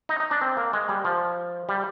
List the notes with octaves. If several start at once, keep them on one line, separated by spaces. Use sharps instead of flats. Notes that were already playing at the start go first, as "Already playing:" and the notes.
D#4
D#4
D4
C4
A#3
G#3
G3
F3
G3